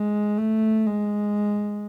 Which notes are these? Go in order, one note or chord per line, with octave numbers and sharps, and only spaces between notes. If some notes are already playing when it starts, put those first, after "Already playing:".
Already playing: G#3
A3
G#3